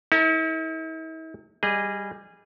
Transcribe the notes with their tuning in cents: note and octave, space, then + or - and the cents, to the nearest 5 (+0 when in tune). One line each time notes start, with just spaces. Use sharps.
E4 -45 A#4 -45
G3 +5 G#4 -15 D#5 +0